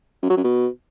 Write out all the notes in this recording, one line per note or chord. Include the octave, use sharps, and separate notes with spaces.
F#2
F#3
F#2
B2